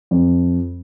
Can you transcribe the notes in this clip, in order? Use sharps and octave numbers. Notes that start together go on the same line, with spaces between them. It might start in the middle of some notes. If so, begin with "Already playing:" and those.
F2